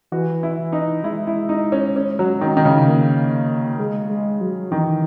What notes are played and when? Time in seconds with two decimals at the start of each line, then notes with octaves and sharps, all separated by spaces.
0.12 E3 F#4
0.43 E4
0.58 E3
0.72 D#4
1.04 G#3 E4
1.27 E4
1.49 D#4
1.72 C#4
1.96 C#4
2.19 F#3
2.41 D#3
2.57 D#3
2.65 C#3
2.88 A#3
3.79 G#3
4.10 G#3
4.41 F#3
4.71 D#3 E3